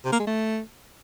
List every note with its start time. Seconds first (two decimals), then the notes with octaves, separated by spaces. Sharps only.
0.05 C3
0.12 A#3
0.19 G#3
0.27 A3